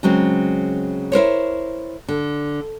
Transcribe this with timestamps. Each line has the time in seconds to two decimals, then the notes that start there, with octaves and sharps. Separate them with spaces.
0.03 C#3 F#3 G#3 C4
1.12 E4 A#4 C5 C#5
2.09 D3